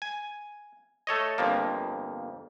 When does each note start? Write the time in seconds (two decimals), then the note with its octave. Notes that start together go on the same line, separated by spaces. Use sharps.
0.02 G#5
1.07 A3 A4 C#5 D#5
1.38 G1 F2 F3 A#3